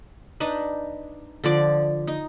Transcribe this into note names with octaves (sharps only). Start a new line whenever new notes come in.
D4 D#4 B4
D3 F3 D5
D#4